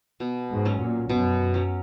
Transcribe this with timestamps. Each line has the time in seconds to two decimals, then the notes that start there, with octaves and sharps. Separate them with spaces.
0.20 B2
0.50 G#2
0.65 F#3 C#4
0.79 A#2
1.09 F#2 B2
1.54 F#3 C#4